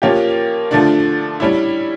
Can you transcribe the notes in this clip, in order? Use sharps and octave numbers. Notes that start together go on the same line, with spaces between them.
F3 A#3 C#4 G4
D3 F3 A3 D4
G3 C#4 E4